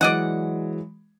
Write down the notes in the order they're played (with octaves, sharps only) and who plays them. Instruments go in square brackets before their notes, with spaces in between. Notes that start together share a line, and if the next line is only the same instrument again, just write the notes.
[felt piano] E3 F#3 G#3 [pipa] D5 D#5 F#5